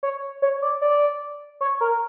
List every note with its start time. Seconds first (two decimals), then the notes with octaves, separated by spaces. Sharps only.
0.03 C#5
0.42 C#5
0.62 D5
0.82 D5
1.61 C#5
1.81 A#4